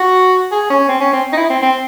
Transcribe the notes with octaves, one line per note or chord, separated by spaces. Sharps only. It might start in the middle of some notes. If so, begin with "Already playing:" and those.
Already playing: F#4
G#4
C#4
C4
C#4
C4
D#4
E4
C4
C4